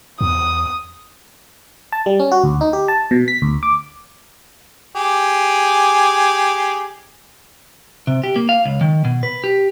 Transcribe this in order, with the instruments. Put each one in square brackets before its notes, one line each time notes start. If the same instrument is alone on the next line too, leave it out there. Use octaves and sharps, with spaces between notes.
[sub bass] E2 [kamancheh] D#6
[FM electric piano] A5
G3
C#4
F#4
D2
D#4
G4
A5
B2
B6
D2
D6
[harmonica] G4 G#4
[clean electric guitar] C3
G4
A#3
F5
C#2
D#3
B2
B4
G4